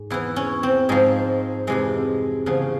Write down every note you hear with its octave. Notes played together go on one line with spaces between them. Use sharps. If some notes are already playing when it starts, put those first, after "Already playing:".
Already playing: G#2
E2 E3 E4
C#4
C4
G#2 F3 G#3
F2 C3 E3 G#3
E2 C#3 F3